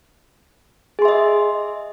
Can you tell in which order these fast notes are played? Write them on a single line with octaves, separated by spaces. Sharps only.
G#4 C6 E5 D#5